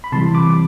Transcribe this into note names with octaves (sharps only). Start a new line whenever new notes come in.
B5
C3 E3 G3 A5 C6
B5 D6